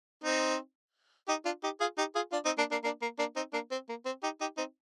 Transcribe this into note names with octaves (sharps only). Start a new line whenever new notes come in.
C4 D#4
D#4 G4
D4 F4
D#4 G4
F4 G#4
D#4 G4
F4 G#4
D4 F4
C4 D#4
A#3 D4
A#3 D4
A#3 D4
A#3
A#3 D4
C4 D#4
A#3 D4
C4
A#3
C4
D#4 G4
D#4 G4
C4 D#4